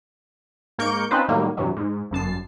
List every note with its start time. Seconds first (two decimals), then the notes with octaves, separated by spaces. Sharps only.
0.78 G#2 A#3 A#4 C#6 G6 D7
1.11 C4 C#4 D#4 F4 B4 C5
1.28 A2 D#3 F#3 G3 A#3
1.57 G2 C3 E3 F#3
1.77 G#2
2.11 G1 F#2 A5 C7